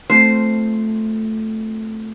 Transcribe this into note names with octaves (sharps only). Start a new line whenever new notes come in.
A3 C4 F4 C5